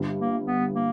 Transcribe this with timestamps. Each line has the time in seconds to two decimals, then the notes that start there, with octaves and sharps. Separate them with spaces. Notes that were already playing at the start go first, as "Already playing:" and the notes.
Already playing: G1 G2 G3
0.18 A#3
0.46 B3
0.74 A#3